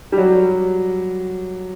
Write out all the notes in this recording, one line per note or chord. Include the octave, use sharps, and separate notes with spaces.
G3
F#3